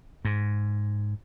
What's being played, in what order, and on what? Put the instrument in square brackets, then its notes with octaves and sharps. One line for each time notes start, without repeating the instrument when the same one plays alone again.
[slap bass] G#2